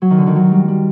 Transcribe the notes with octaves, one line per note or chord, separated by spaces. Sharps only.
F#3
D#3
D3
D#3
F#3
G3
G3